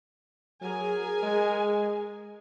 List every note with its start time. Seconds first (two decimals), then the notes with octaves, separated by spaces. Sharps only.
0.62 F#3 G#4 A#4 G#5
1.23 G#3